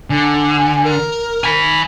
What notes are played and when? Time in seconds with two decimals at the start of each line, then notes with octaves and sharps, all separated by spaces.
0.10 D3 G#5
0.84 A#4
1.44 G#5 B5